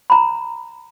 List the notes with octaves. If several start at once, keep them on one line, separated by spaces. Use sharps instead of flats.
A#5 B5